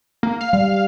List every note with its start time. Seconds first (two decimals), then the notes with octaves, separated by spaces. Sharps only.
0.23 A#3
0.41 F5
0.53 G3 F5